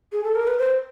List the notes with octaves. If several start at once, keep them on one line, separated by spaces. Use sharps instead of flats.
G#4
A4
A#4
B4
C5